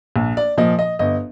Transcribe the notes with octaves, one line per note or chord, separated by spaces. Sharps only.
A#1
D5
A#2 F3 D#5
D#5
G1 D#5